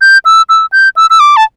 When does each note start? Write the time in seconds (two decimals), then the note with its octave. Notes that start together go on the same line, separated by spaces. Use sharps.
0.01 G6
0.25 E6
0.49 E6
0.72 G6
0.97 E6
1.10 E6
1.20 D6
1.37 A5